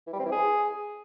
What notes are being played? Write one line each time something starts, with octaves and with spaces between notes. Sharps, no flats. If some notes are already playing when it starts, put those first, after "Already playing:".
E3
G3
C4
E3
G#4